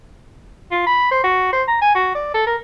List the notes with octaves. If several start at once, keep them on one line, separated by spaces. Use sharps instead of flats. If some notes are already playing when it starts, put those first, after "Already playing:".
F4
B5
C5
F#4
C5
A#5
G#5
F#4
D5
A4
A#4